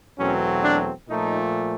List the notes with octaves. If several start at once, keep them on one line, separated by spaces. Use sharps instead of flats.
E2 B2 F#3 A3 C4 C#4
D4
A#2 F3 A3 D#4